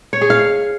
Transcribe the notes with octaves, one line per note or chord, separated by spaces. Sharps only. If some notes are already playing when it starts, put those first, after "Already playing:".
C#5
G#4
F5